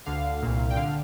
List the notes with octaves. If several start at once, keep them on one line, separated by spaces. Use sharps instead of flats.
D2 D3 F5
C2 A#2
G5
D3 F5